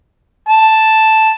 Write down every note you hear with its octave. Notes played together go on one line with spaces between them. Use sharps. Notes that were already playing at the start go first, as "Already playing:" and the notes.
A5